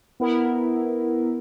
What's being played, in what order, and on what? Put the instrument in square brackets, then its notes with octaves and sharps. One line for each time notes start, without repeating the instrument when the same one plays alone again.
[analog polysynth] B3 E4 A#4